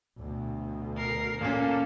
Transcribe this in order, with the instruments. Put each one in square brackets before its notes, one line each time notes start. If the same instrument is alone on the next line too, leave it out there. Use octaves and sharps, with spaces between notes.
[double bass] D2 B2
[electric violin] A#4 C7
[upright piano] A#2 C#4 [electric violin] A#3 A4